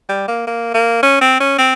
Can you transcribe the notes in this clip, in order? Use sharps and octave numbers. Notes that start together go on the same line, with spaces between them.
G3
A#3
A#3
A#3
C#4
C4
C#4
C4